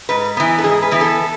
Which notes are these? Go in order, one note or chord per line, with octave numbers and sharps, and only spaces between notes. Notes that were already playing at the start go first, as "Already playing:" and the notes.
G#2 B4
E3 B3
A4
G#2 G#4
B4
E3 B3
A4